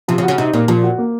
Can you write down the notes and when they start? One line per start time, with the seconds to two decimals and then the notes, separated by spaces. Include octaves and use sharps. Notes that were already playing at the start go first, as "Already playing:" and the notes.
0.08 C3 F3
0.18 C#3
0.23 F#4
0.28 C#3
0.38 C3 D#4
0.53 A#2 A#3
0.68 A#2 F3
0.83 F#4
0.98 A#3